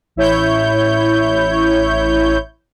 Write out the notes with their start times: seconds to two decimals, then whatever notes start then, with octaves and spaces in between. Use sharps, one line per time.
0.16 A1 E4 C#5 G6